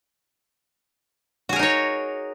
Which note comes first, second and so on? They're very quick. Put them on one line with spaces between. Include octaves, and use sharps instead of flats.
F#4 G#4 A#4 D#4 C#5